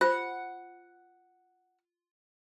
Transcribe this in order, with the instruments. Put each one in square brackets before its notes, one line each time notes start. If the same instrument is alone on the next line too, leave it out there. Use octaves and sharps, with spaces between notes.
[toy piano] F4 [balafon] C5 [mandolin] F#5